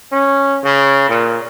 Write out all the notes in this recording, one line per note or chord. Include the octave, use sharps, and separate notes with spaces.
C#4
C#3
A#2